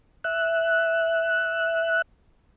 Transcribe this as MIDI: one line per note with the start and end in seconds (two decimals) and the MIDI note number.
0.24 2.02 76
0.24 2.02 90